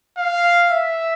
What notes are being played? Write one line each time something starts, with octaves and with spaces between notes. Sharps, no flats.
F5
E5